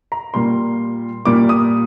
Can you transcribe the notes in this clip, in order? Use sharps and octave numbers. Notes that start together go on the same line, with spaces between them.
A#5
A#2 G3 A#3 C6
A#2 G3 A#3 D6
D#6